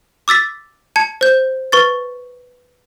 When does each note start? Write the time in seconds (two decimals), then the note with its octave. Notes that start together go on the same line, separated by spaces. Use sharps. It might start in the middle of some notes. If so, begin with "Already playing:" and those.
0.28 D6 E6 A6 B6
0.96 A5 G#6 C#7
1.21 C5 G6
1.72 B4 C#6 A6